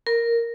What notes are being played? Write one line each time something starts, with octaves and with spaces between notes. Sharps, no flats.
A#4